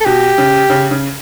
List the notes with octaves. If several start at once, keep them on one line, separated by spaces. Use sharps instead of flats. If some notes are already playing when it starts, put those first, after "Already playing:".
A4
B2 G4
C#3
C#3
C#3